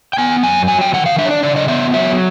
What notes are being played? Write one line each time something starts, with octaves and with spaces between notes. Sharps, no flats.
G5
B3 G#5
F#2 G#5
F#3 G#5
G5
D#3 F#5
F5
D4 E5
C#5
D5
C#3 D5
D#5
B3 E5
F#3 E5